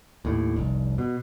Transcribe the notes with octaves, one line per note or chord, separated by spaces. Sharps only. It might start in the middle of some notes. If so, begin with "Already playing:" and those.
D#2 A2
F1 C2
B2